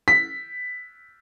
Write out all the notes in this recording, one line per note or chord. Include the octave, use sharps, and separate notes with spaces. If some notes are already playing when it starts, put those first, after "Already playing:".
B6